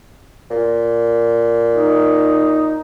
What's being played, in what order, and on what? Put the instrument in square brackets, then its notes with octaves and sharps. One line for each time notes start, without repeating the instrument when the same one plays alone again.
[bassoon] A#2
[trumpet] D#4